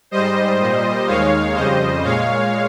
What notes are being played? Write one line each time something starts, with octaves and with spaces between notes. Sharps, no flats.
G#2 G3 C5 D#5
A#2 G3
D#2 D#3 G#3 C#5 F5
F2 C#3 G3 C5 D#5
A#2 G#3 C#5 F5